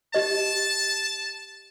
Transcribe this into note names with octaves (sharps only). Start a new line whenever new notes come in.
G4 D#5 A5